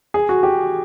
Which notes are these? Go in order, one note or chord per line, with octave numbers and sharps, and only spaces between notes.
G#4
F#4
G4